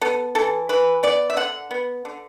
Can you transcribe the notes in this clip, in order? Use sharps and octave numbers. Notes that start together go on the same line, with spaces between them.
B3 A4
E3 A4
E3 B4
B3 D5
E5
D3 F#5
B3
D3